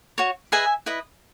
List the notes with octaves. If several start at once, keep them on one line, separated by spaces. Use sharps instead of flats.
F#4 C#5
G#4 B4 D#5 E5 G#5
E4 B4 D#5